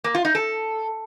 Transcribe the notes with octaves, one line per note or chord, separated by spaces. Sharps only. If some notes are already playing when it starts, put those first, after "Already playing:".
A#3
F4
D#4
A4